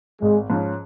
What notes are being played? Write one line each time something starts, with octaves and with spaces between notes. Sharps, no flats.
G#1 G#3
G#2 F3 C#4